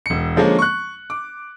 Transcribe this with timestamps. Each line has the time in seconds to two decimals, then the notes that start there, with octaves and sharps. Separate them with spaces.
0.06 E1 C#7
0.36 D3 F3 G#3 A#3 C#4
0.59 C#6 F#6
1.10 D6